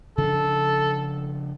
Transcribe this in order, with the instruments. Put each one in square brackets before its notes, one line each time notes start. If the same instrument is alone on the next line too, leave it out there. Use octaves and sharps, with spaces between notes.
[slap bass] C#3 F3 D4 [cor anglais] A4